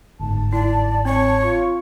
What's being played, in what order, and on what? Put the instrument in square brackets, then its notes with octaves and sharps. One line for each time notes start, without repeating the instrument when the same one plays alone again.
[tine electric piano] G1 G#2 [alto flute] A5
[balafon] E4 [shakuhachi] D5
[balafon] C4 [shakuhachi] C#5
[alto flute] F4 [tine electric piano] C#6